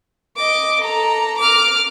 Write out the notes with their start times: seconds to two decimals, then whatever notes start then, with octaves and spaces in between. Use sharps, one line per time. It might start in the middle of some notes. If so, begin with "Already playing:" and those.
0.36 D#5 D6
0.81 A4 A#5
1.38 D6 F6